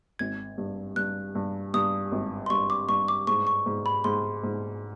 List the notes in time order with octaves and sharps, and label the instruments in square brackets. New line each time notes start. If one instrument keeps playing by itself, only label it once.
[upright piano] G#1 [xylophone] G#6
[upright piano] G2
[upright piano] G2 [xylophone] F#6
[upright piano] G2
[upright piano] G2 [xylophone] D#6
[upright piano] G#1
[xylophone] C6
[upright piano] G2 [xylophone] C#6
[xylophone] D6
[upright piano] G2 [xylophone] C#6
[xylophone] D6
[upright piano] G#2 [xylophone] C#6
[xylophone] C#6
[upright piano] G#2
[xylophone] B5
[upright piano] G#2 [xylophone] C6
[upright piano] G#2